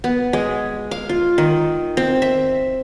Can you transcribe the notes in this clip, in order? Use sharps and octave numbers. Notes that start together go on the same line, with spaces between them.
B3
G#3
F5
F4
D#3
C4
E5